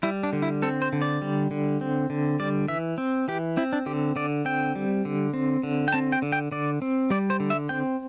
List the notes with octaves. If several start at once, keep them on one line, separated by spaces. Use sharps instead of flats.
G3 E4
D4
D3
E4
C4 A4
C5
D3
D5
G3
D3
C4
D3
G3 D5
E3 E5
C4
E3 G4
C4 E4
D4
D3 G4
D3 D5
C4 G5
G3
D3
C4
D3
G5
C4 A5
G5
D3
G5
D3 D5
C4
G3 D5
C5
D3
E5
C4 G5